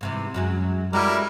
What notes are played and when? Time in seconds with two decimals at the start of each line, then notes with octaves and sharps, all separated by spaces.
0.01 G#2 C3 E3
0.34 F#2 F#3 G#3
0.93 G3 G#3 E4 F#4 A4 A#4